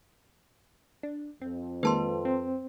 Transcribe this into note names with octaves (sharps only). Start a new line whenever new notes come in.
D4
F2 C4
D#3 G#3 A#3 B4 A5 C6
C4